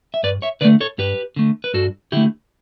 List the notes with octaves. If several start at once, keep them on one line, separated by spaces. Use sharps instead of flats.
E5
G2 B4 D5
C#5 E5
D3 A3 B4 D5
A4 C#5
G2 G4 B4
D3 A3
B4
G2 F#4 A4
D3 A3 E4 G4